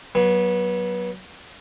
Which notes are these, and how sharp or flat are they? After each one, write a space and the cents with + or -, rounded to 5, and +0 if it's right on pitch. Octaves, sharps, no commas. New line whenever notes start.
F#3 +15 B3 -25